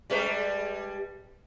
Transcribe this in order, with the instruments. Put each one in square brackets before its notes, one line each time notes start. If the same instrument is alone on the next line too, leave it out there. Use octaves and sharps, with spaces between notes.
[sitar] G3 G#3 B4